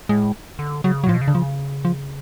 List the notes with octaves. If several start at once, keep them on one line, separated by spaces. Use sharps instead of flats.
A2 G#3
D3
C#3 F#3
F#3
A2 F3
B2
C#3
D3
F3
F3